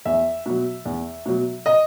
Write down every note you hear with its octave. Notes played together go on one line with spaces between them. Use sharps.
E2 E5
B2 F#3
E2
B2 F#3
D#5